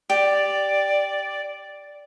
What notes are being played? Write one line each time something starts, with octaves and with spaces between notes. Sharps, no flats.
G4 D5